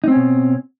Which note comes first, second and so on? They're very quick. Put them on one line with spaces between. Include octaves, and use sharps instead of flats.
D#4 C4 C#4 B2